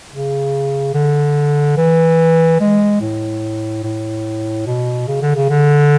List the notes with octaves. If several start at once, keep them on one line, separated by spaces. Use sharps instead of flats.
C#3
D3
E3
G#3
A2
A2
B2
C#3
D3
C#3
D3